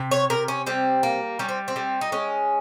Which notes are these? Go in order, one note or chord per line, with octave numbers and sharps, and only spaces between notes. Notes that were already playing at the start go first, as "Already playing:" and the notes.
Already playing: C3
C#5
C3 A#4
C#4
G3 C4
A#3
G3 C#4
C4
C4
G3
D#4
G#3 C#4